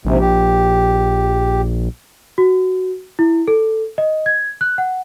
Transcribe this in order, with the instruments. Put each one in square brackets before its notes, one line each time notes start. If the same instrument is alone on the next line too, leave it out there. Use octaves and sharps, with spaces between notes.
[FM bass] A#1 [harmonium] G#2 C3
[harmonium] G4
[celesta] F#4
E4
A4
D#5
G#6
F#6
F#5